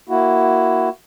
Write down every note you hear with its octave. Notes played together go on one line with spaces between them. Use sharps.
A#3 E4 F#4